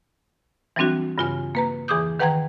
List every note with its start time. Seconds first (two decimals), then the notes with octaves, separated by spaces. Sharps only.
0.76 E3 F#3 G3 C4 D4 F#4
1.18 G2 C#3 F4 G#5 F6
1.55 A#3 B4 A#5
1.88 E2 E3 G#4 D6 D#6 G6
2.19 D#3 B4 F#5 G5 A#5 G#6